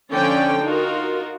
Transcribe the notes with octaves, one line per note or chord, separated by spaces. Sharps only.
D3 F3 C#4 D5 G5
D#4 F4 F#4 A#4